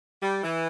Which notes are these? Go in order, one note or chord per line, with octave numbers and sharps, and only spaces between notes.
G3
E3